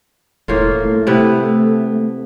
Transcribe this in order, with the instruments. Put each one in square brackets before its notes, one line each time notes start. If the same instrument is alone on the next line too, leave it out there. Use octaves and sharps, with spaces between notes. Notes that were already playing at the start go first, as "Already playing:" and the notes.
[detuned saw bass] E1 [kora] A2 A#3 F4
[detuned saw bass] A3
[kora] C3 B3 E4